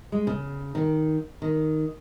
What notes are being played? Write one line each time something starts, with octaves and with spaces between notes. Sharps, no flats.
G#3
C#3
D#3
D#3